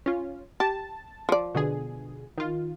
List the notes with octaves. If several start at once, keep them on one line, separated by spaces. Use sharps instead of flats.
C#4 F4
G4 A5
F3 D5
B2 D3 G#4
D#3 F4